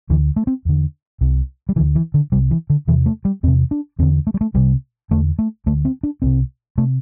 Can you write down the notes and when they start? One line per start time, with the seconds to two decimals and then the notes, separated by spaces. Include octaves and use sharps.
0.10 D2 D3 E3
0.36 A3
0.47 C4
0.65 E2 D3
1.21 C2 C3
1.69 G3
1.76 D2 D3 E3
1.95 E3
2.14 D3
2.32 C2 C3 G3
2.51 E3
2.70 D3
2.88 E2 C3 E3
3.06 A3
3.25 G3
3.43 E2 C4
3.48 C3
3.71 D4
3.99 E2 D3 C4
4.27 A3
4.34 G3
4.41 A3
4.54 C2 C3 G3
5.11 E2 D3 A3
5.39 A3
5.66 D2 D3 A3
5.85 C4
6.03 D4
6.22 C2 C3 C4
6.78 C3 A3